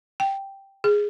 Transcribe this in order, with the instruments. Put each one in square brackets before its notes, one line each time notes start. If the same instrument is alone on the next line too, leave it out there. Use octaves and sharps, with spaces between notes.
[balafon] G5
G#4